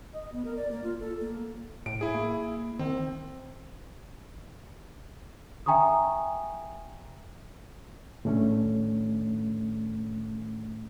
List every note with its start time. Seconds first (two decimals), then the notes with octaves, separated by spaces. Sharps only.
0.13 D#5
0.32 B3
0.45 A#4
0.56 D5
0.71 A#3
0.84 F4
1.00 A4
1.21 A#3
1.86 A2 D7
2.01 E4 G#4
2.14 A#3
2.79 D#3 C4
5.66 E5 G5 G#5 A#5 C#6 D#6
8.25 A2 D#3 A3 C#4 D4